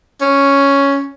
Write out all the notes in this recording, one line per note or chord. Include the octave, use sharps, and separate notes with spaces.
C#4